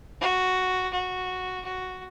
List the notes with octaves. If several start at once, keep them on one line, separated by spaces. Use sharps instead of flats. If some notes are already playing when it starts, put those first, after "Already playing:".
F#4
F#4
F#4